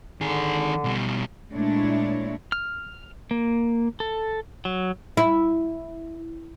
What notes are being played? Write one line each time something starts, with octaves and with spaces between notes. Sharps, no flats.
D3 D#3 G#4
B2 G3
A#2 G#3 A3 D4 E4 C#5
F6
A#3
A4
F#3
E4